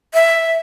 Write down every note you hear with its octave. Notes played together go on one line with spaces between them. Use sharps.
E5